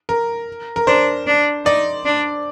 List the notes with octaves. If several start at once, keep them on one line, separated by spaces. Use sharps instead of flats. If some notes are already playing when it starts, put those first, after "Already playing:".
A#4
A#4
D4 C5
D4
D#4 D5
D4